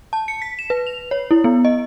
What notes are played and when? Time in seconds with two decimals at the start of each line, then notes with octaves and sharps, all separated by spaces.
0.13 A5
0.28 C#7
0.42 B6
0.59 E7
0.70 B4
0.87 F7
1.11 C#5
1.31 E4
1.44 B3
1.65 D#5